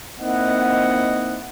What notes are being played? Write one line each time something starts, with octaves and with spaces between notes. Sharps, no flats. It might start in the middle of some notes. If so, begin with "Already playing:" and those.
A#3 C4 D#4 E4 D#5 F#5